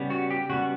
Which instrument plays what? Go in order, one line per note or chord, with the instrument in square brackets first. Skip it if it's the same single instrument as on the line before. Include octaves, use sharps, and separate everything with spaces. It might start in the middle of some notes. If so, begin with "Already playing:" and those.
Already playing: [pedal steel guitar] C#3 G3 B3
F#4
G4
C#3 G3 B3 F#4